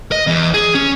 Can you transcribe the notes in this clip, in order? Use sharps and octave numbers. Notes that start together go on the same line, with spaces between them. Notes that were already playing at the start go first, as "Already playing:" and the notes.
D#5
E2
G#4
C#4